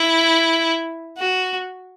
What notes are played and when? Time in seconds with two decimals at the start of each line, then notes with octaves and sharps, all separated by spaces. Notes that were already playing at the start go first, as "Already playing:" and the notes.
Already playing: E4
1.19 F#4